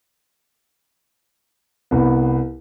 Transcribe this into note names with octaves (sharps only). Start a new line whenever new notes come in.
C2 B3